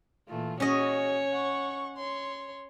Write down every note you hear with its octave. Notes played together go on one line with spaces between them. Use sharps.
A#2 E3 A3 F4
C#4 F#4 G#4 C#5 D#5
F#5 C#6
C#5 C6